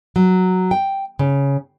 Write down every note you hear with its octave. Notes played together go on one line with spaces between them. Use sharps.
F#3
G5
C#3